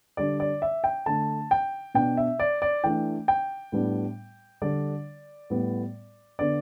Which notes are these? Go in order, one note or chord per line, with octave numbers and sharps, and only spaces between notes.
D3 G3 D4 D5
D5
E5
G5
D3 A3 D4 A5
G5
B2 B3 D4 G5
E5
D5
D5
E3 A3 D4 G5
G5
A2 G3 B3 D4
D3 G3 D4 D5
A2 G3 B3
D3 B3 D4 D5